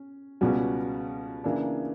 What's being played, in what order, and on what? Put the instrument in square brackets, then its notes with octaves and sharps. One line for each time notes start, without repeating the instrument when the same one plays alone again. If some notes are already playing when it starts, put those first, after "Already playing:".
Already playing: [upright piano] C#4
C#2 B2 G3 C#4 F#4
C#3 E3 A#3 D4